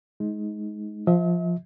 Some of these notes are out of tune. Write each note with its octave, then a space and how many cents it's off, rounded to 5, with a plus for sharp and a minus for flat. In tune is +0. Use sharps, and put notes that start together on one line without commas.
G#3 +20 D#4 +15
F3 +0 E5 -45